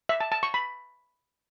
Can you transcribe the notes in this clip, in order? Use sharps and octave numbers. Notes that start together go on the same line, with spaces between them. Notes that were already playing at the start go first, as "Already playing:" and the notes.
E5
A5
A5
C#6
B5